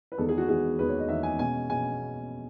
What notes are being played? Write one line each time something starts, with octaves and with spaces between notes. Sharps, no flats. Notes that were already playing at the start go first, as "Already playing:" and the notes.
B4
E2 D#3 G#3 B3 A4
G#4
F#4
E2 D#3 G#3 B3 G#4
E2 D#3 G#3 B3 B4
C#5
D#5
E2 D#3 G#3 B3 E5
G#5
B2 G#3 C#4 G#5
B2 G#3 C#4 G#5